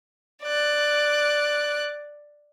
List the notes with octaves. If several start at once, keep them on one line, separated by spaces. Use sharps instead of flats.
D5 F#6